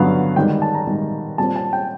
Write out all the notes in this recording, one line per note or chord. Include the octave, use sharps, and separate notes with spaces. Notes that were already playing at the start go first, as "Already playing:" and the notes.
Already playing: G2 D3 F#3 B3 F5
G#2 D#3 G3 G5
A5
A#5
G#2 D#3 G3
A#2 G3 C4 A5
A5
G5